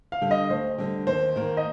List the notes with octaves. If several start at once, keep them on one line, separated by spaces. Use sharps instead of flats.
F5
D3 G3
D#5
D2 C5
D3 G3
D#2 C5
D#3 A#3
D#5